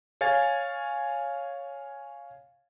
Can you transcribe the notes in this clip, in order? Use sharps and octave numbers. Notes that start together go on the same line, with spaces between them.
C#5 F5 G#5 G#6 A6